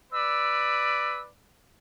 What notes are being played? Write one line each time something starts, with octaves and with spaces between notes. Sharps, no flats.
B4 D5 E6